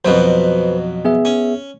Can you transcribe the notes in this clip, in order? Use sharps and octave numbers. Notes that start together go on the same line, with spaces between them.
F2 B2 F#3 B4 C5
B3 G#4 E5
C#4